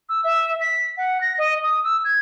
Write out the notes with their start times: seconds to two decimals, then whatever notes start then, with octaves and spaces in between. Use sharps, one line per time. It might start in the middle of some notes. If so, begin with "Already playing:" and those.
0.09 E6
0.24 E5
0.61 B6
0.97 F#5
1.21 A#6
1.38 D#5
1.63 D#6
1.84 E6
2.05 G#6